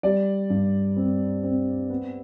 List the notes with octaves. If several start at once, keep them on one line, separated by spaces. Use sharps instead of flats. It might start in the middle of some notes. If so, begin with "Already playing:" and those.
G3 D5
G2
C4
C4
B3